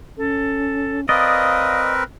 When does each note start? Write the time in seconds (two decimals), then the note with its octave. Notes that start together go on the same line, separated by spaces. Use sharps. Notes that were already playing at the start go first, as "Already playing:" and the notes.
0.18 C#4 A4
1.09 C4 A#4 B4 D5 D#5 F5 D#6